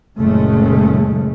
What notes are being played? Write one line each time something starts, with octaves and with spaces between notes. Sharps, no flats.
F#1 A#2 C#3 G#3 A3